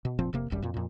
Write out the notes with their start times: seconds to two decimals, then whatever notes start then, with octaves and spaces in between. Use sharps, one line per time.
0.05 B2
0.19 F1 A#2 F3 C4
0.33 F1 C3 A#3
0.50 D1 G#1 F#2 G3
0.62 F2 A#2
0.74 F2 A#2